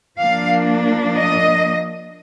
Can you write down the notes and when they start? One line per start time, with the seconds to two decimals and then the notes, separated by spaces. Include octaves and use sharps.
0.20 F3 A#3 D4 F5
1.15 D#5